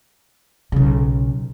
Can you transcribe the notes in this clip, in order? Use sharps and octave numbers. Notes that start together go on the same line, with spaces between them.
B1 C#3